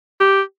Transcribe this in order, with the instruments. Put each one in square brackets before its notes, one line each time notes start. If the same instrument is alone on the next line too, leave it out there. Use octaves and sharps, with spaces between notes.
[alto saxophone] G4